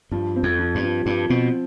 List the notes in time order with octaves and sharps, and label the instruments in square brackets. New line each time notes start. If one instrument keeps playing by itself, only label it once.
[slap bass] G2 [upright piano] F3
[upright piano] C4
[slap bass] F2
[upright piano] F3
[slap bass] G2
[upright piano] F3
[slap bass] G2 [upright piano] F3
[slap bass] B2 [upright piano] C4